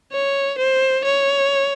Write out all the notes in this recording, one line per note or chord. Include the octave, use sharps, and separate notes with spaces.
C#5
C5
C#5